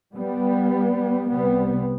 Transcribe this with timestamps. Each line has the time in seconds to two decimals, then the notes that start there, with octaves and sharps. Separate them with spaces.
0.15 G3 B3
1.29 C2 C3 G3 B3